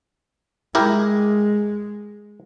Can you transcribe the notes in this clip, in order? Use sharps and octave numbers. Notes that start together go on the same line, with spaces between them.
G#3 E4 G4 A#4